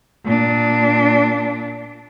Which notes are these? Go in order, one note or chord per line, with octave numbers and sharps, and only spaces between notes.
A#2 D4